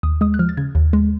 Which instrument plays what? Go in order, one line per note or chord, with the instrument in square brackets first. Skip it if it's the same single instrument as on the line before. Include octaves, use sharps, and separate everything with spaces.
[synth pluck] D#2 D#6
G#3 D#6
F#6
F3 F6
A6
C#3 G#6
D#2
G#3